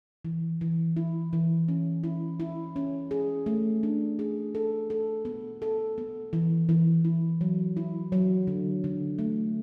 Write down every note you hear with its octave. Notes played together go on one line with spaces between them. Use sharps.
E3
E3
E4
E3
C#4
E4
E4
C#4
G#4
A3
D4
G#4
A4
A4
B3
A4
B3
E3
E3
E4
F#3
E4
F#3
D3
D3
A3